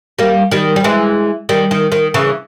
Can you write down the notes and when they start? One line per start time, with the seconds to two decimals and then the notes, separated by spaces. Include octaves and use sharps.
0.19 G3 A#3
0.51 D#3 G3
0.76 G3
0.84 E3 G#3
1.49 D#3 G3
1.71 D#3
1.92 D#3
2.14 C#3 E3